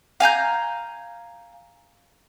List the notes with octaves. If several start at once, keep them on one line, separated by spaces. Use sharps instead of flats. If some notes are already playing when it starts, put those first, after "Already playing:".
F5 G#5 A#5 G6